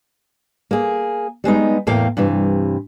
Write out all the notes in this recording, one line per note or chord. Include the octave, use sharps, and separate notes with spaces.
A#3 G#4
G3 G#3 B3 D#4
E2 A2 A#3 F5 G5
G2 C3 E3